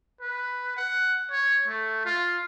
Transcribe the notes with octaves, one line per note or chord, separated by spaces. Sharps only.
B4
F#5
C#5
A3
F4